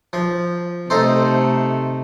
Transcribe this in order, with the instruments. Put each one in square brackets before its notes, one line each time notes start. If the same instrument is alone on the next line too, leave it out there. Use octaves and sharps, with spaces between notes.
[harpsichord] F3
[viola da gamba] C3 A3 [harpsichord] D#4 A4 C5